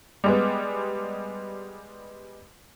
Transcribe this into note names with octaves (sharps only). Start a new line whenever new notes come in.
G3 G#3 B3